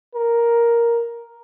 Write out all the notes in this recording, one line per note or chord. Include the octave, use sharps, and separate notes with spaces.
A#4